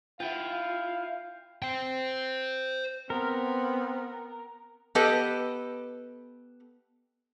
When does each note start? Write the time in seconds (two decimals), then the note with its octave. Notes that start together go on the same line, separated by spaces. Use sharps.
0.20 E4 F4 F5 G5
1.62 C5 G5
3.10 B3 C4 A#4
4.95 B3 G4 A4 B4 D#5